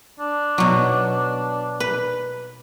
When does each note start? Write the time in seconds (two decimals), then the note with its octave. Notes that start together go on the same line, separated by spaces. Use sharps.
0.20 D4
0.58 B2 F#3
1.80 B4